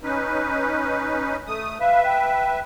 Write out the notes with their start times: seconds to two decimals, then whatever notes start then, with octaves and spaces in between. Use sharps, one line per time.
0.03 C#4 D#4 B4
1.47 A3 D#6
1.80 B4 E5 F5
2.04 G5